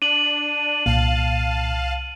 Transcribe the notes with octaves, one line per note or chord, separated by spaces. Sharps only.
D4 D#7 F#7
C2 A#2 F5 A5